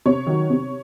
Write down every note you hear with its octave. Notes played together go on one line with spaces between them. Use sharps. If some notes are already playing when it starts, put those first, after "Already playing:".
C3 C#5
D#3 F#3
C3